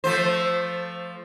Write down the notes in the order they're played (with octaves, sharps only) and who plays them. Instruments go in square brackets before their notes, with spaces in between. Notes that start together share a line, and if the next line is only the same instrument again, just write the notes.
[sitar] F3 A3 C5